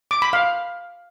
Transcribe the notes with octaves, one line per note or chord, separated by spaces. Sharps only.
D6
B5
F5